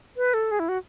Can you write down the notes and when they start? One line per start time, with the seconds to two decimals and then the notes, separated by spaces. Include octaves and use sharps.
0.17 B4
0.34 A4
0.51 G#4
0.60 E4
0.69 F#4